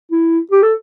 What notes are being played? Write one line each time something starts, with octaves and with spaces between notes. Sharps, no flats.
E4
G4
A4